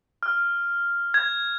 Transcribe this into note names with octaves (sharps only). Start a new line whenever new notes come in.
F6
G#6